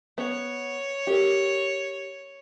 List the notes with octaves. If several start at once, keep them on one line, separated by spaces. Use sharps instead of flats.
B3 C#5
G4 A#4